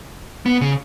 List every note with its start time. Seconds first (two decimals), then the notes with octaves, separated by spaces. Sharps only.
0.46 B3
0.61 C#3